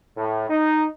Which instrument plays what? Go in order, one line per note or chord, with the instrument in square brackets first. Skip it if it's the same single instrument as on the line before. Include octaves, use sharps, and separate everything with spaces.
[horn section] A2
D#4